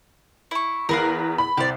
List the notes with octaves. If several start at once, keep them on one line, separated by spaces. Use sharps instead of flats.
E4 C#6
E2 A#4 B4 F5
B5
C2 G4 C5 D5